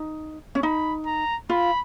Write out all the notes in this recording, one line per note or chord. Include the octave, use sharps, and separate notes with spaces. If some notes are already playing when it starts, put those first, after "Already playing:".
Already playing: D#4
C#4
D#4 B5
A#5
F4 B5